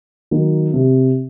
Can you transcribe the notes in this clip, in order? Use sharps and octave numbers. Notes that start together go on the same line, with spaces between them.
D#3 F#3 A#3
C3